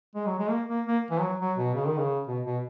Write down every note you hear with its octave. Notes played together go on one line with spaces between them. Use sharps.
G#3
F#3
G#3
A#3
A#3
A#3
E3
F#3
F#3
B2
C#3
D#3
C#3
B2
B2